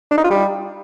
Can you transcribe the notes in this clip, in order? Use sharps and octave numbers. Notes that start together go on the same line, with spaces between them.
D4
D#4
F4
G3